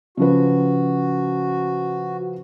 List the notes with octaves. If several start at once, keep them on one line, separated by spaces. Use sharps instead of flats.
C#3 F3 F#4 B4